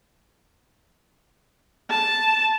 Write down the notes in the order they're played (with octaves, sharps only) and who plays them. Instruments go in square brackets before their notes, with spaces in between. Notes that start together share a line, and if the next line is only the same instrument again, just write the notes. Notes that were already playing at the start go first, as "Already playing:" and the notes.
[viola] A5